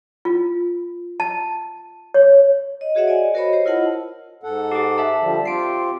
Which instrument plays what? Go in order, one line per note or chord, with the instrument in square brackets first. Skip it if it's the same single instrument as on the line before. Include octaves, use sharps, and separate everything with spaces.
[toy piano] F4
A5
C#5
[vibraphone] D#5
F#4 G#4 C#5 E5 F#5
D5 D#5 G#5
F#4 A#4 C5 C#5 D#5 B5
G4 C5 C#5
E4 F4 A#4 D#5 F#5 A5
[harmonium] G#2 A4 F#5
[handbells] G4 G#4
E5 A5
[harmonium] D3 F3 G3
[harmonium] C4 F4 G4 [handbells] C7 D7